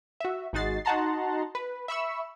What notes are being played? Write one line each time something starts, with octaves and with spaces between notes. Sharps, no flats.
F#4 E5
G#1 G#3 D#4 F#4 A6 C7
D#4 F#4 F#5 A5 A#5 C6
B4
E5 B5 C#6 E6